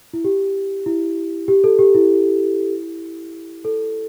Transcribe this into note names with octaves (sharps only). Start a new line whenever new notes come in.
E4
G4
E4
G4
A4
G4
E4
A4